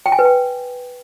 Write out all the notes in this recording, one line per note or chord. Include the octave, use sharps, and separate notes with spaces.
G5
G#5
B4
G5